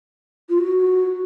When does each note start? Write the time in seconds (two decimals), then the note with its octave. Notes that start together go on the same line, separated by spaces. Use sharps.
0.49 F4
0.58 F#4